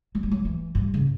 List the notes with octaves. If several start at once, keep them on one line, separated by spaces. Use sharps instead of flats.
F#3
G3
F#3
E3
G2
C#3